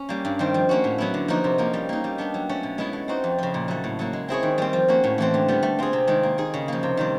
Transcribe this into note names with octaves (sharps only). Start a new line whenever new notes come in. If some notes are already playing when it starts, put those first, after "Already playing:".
Already playing: C#4
G3 A#3
G2
D#3 G3 C4
F3
A#3 C#4 F#4
A2
F#3 B3 E4
D3
F3 A#3 D#4 F#4
C3
F3 A#3 C#4
G3
A#3 D#4
G3
B3 D4 G4
F#3
A3 C#4
B2
G#3 B3 E4 G#4
A3
C4 D#4 F#4
F2
C#3 F3
A#2
F#3 A3
A2
F#3 A#3
G#3
C4 E4 G#4 C#5
D#3
G3 C4
F3
A#3 C#4 F#4
A2
E3 A3 C4
D3
G3 B3
A3
C4 F4 G#4
C3
D#3 G#3
A#3
D#4 G#4
C#3
F3 A#3
C3
D#3 G3 C4